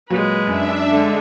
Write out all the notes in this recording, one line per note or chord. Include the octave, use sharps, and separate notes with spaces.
A#2 F#3 G#3 B4
F#2 D4 E5
D3 G#3